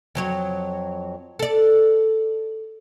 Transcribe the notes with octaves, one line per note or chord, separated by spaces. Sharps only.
F2 F#3 C#5
A4 D5